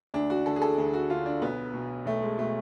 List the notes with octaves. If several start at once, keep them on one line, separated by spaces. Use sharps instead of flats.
D2 D4
F#4
D3 A4
G#4
A4
D2 G#4
F#4
D3 F4
D4
B1 B3
B2
B1 A3
G#3
B2 A3